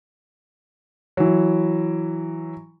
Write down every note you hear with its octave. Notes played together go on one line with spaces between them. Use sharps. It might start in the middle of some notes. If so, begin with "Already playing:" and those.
E3 F#3